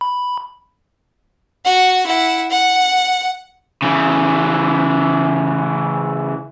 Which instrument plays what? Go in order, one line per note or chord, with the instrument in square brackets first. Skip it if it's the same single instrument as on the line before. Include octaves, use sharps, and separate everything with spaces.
[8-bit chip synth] B5
[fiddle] F#4 F#5
E4 F#5
F#5
[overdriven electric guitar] C#3 E3